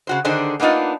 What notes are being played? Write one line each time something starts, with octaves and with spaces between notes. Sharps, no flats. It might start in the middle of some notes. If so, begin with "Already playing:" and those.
C#3 F#4 C5
D3 D#3 D4 G#4 C5
A#3 B3 D4 D#4 F4